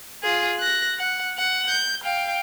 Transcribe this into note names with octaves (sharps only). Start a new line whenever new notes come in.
F4 G#4
F#6 A#6
F#5
F#5
G6
F5 G5